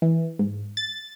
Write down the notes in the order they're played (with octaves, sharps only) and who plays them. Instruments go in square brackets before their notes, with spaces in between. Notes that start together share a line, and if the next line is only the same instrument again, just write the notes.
[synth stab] E3
G#2
A6